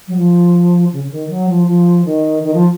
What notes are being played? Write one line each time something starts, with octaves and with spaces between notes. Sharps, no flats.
F#3
F3
C#3
C#3
D#3
F#3
F3
F3
D#3
D#3
F3